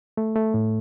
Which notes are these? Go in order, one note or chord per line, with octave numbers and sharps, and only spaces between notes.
A3
A3
A2